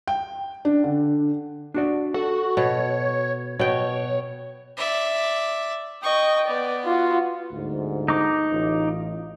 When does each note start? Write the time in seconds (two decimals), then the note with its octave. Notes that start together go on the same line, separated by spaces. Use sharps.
0.08 G5
0.65 D4
0.84 D3
1.74 D4 F#4 D5
2.14 F#4 A4
2.57 B2 C#5
3.59 B2 C#5 G5
4.77 D5 E5
6.03 D#5 G5 C#6
6.47 B3 D5
6.84 F4 F#4
7.52 G1 D2 G#2
8.08 D#4 D6
8.50 A1 F4